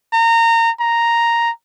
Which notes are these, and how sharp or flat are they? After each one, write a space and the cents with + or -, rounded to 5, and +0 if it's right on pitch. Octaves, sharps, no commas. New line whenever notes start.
A#5 -25
A#5 +0